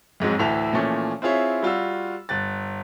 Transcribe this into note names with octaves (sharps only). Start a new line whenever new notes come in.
F2 G#2 F#3 G#3
D2 A2 E3 A4 E5 F7
A#2 E3 F3 A3 C#4
C4 E4 F4 G#4 C#5 E5
G3 F4 F#4 E6
G1 F#6 A6